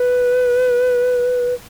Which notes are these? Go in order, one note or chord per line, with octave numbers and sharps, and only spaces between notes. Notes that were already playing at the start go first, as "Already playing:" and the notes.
Already playing: B4